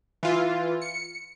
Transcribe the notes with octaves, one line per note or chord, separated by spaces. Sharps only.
E3 F4
C#7